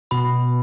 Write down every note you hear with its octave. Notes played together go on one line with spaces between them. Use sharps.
B2 B5